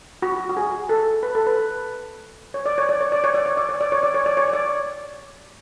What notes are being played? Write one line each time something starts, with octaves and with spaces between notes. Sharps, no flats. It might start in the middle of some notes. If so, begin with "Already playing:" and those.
F#4
F#4
G#4
A4
B4
A4
B4
C#5
D5
C#5
D5
C#5
D5
C#5
D5
C#5
D5
C#5
D5
C#5
D5
C#5
D5
C#5
D5